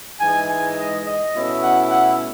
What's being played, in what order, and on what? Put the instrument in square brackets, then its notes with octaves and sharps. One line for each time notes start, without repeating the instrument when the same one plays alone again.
[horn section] G#2 E3 G#3 G#5
G#5
D#5
D#5
B2 A3 C#4 E4
F#5
F#5